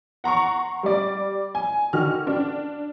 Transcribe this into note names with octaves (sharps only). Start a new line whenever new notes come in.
F#5 A#5 C6 C#6
G3 D5
G#5
D3 D#3 F#4 F6
D4